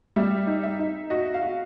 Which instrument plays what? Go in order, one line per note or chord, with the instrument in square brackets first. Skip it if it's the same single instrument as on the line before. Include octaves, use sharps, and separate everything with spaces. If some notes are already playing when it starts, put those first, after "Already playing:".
[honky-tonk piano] G3 [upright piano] E5
[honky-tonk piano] D#4
[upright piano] E5
[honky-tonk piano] D#4
[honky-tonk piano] F#4 [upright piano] D#5
[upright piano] F5
[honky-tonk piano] F#4